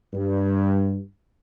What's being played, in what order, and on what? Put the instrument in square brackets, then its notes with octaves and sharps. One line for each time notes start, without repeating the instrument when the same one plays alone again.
[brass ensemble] G2